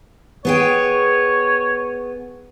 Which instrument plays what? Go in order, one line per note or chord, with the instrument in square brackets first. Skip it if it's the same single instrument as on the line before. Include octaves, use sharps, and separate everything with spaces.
[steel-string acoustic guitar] B3 G#4 G5 [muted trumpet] C#5